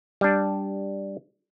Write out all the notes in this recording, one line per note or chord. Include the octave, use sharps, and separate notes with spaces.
G3 D4